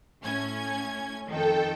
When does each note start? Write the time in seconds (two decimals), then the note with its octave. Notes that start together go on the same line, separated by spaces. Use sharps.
0.24 A2 C#4 G#6
1.28 F2 D#3 A4 G5